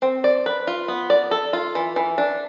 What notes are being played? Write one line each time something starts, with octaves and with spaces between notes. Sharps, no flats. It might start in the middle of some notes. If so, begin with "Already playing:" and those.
C4
D5
B4
F4
B3
D5
A4
F4
E3
E3
D4